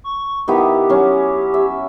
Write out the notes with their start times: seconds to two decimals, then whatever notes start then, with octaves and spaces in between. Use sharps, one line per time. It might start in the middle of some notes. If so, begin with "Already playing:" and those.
0.04 C#6
0.48 D#3 B3 E4 G4
0.89 F#3 C#4
1.54 E5